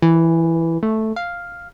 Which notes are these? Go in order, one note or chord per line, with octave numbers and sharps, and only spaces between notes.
E3
A3
F5